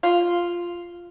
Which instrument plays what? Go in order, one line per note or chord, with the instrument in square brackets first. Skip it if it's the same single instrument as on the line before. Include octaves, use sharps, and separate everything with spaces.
[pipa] F4